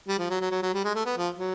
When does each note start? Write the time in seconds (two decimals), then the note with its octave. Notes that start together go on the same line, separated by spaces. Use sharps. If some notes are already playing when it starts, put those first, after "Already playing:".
0.08 G3
0.19 F3
0.30 F#3
0.41 F#3
0.51 F#3
0.62 F#3
0.74 G3
0.84 G#3
0.95 A3
1.05 B3
1.17 F3
1.39 F#3